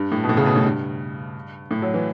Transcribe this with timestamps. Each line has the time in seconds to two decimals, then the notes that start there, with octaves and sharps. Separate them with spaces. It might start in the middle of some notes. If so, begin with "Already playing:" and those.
Already playing: G2
0.12 A2
0.24 B2
0.29 A2
0.37 C#3
0.46 B2
0.56 A2
0.64 G2
1.71 A2
1.82 F#3
1.94 E3